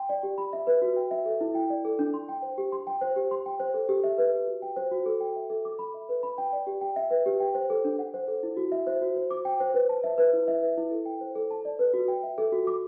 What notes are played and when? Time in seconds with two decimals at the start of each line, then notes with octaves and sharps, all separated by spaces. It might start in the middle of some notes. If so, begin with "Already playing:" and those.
Already playing: G5 C6
0.09 D5
0.23 G4
0.38 B5
0.53 E5
0.67 B4
0.82 F#4
0.96 G5
1.11 E5
1.26 A4
1.41 E4
1.55 G5
1.70 D5
1.85 A4
1.99 D4
2.14 C6
2.29 G5
2.42 C5
2.58 G4
2.72 C6
2.87 G5
3.01 C5
3.16 G4
3.31 C6
3.46 G5
3.60 C5
3.74 A4
3.89 G4
4.04 E5
4.18 B4
4.34 G4
4.48 F#4
4.62 G5
4.76 C5
4.91 F#4
5.06 A4
5.21 G5
5.36 E5
5.50 A4
5.65 D6
5.79 B5
5.94 E5
6.09 B4
6.23 B5
6.38 G5
6.53 D5
6.67 G4
6.81 G5
6.96 E5
7.10 B4
7.26 G4
7.40 G5
7.55 C5
7.70 A4
7.85 D4
7.99 F#5
8.14 C5
8.28 A4
8.43 E4
8.57 F#4
8.72 E5
8.87 C5
9.01 F#4
9.16 C5
9.31 D6
9.45 G5
9.60 C5
9.74 B4
9.89 A5
10.04 E5
10.18 B4
10.33 E4
10.48 E5
10.62 B4
10.77 E4
10.91 A4
11.06 G5
11.21 C5
11.35 A4
11.51 A5
11.65 D5
11.79 B4
11.94 F#4
12.08 G5
12.23 E5
12.38 A4
12.52 F#4
12.67 D6